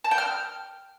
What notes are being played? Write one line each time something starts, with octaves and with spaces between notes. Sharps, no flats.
A5
G5
F6